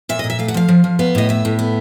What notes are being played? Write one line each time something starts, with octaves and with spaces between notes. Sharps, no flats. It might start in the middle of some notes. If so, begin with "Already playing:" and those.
A#2 E5
D#5
A#2
E5
A3 F5
F#5
F3 F5
F3
F3
B3 F5
A2 D#5
B3 E5
A2
B3